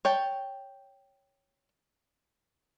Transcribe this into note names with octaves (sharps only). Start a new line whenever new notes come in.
C#5 G5 A5